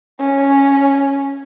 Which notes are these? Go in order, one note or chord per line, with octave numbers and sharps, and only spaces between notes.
C#4